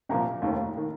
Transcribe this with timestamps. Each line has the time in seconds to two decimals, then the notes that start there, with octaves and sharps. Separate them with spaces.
0.09 C2 A#2 F3 A#5
0.42 F1 D#2 D#3
0.77 D#3